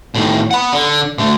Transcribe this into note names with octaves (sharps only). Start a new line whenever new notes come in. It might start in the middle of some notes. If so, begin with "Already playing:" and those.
A2 D#3
F#5 B5
D3
D3 A3